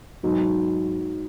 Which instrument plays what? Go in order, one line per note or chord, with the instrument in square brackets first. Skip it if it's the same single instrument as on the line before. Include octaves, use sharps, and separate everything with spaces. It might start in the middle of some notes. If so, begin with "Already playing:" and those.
[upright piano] G#2 F#3 D#4 F#4